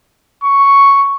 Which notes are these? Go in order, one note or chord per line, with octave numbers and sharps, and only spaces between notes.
C#6